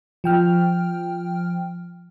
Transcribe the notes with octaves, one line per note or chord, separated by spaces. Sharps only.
F3 G5 F6